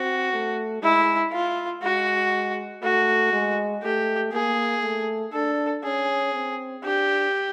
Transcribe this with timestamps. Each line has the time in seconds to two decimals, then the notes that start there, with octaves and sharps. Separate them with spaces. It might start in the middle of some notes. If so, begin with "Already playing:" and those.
Already playing: C4 F#4
0.33 A3
0.82 G#3 E4
1.32 F4
1.83 G#3 F#4
2.83 A3 F#4
3.32 G#3
3.83 A3 G4
4.33 A#3 G#4
4.83 A3
5.33 D4 A4
5.83 C#4 G#4
6.34 C4
6.83 D4 G4